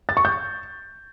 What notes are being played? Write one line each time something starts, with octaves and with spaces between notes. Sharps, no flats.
A6
C#6
G6